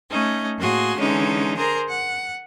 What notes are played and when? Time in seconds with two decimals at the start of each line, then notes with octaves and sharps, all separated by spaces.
0.10 A3 C#4 D#4 D#5
0.58 A2 A#3 F#4 G#4 C6
0.97 D3 E3 G#3 C#4 D#4
1.57 G#4 A#4 C5 A#5
1.89 F#5